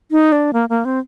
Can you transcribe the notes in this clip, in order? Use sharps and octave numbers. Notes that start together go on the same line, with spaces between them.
D#4
D4
A#3
A#3
C4